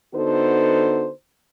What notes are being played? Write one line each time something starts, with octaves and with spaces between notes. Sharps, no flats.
D3 B3 D#4 F#4 A4 C5